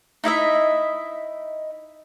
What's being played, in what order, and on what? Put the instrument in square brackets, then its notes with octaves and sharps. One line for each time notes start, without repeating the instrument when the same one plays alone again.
[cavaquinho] D#4 E4 D#5 E5